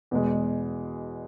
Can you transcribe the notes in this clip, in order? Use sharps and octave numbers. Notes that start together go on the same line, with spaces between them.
E2 B2 G#3